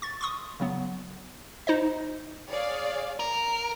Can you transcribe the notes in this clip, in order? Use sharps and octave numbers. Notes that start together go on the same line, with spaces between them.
C#6 A6
C6 C#6 D#6
C#3 F#3 B3
D#4 C5 D#5
G#4 C#5 D5 F5
A#4